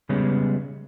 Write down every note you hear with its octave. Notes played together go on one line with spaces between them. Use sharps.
C#3 G3 G#3 B3 C#4